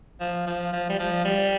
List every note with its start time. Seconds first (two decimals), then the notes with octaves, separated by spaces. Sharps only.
0.21 F3
0.47 F3
0.73 F3
0.90 G3
0.99 F3
1.25 G3